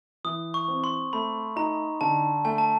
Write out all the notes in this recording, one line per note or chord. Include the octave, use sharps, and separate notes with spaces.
E3 D#6
C#6
C4
C6
A3 B5
D#4 A#5
D3 A5
A3 G#5
A5